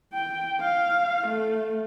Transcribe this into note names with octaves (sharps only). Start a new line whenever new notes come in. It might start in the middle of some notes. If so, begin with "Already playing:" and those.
G5
F5
A3